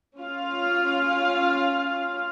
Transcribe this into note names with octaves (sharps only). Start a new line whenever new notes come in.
C#4 F4 F5